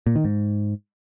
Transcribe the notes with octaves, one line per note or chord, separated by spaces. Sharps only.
A#2
D#3
G#2